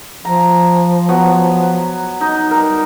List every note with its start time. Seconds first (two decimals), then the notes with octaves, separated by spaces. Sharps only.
0.25 F3 A#5
1.08 F#3 B3 C#6
2.21 D#4 D#5
2.51 G3 A#4